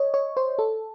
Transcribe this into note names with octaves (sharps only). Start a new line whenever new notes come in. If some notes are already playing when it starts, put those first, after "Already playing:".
Already playing: C#5 D#5
C#5
C5
A4